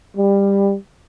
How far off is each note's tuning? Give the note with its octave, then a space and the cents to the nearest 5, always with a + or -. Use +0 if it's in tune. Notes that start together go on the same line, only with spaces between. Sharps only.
G3 +20